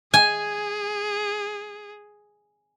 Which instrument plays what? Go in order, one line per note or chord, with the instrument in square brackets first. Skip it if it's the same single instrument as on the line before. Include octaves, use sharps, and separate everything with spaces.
[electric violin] G#4 [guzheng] G#5